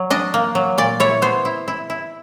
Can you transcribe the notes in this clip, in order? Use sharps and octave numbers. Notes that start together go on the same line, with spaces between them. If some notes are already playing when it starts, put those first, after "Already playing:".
Already playing: F#3
D4 D#5
A#3
F#3
A#2 D5
E4 C#5
B3 C5
E4
E4
E4